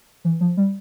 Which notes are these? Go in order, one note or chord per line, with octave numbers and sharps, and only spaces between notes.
E3
F3
G3